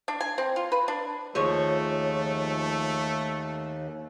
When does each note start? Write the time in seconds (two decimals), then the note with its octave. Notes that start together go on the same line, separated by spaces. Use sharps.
0.08 D4
0.20 G#5
0.38 C4
0.56 F4
0.72 B4
0.88 D4
1.35 D#2 F3 G#3 A3 C#5